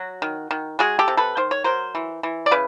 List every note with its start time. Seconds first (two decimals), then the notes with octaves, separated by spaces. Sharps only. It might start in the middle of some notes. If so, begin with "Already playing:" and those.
Already playing: F#3 F#4
0.22 D#3
0.51 D#3
0.79 G#3 F#4 G#4
0.99 G4 A4
1.08 C3
1.17 A4 B4
1.37 D#3 C5
1.51 C#5
1.64 F#3 A#4 C5
1.95 E3
2.23 E3
2.46 D5
2.51 C#3 B4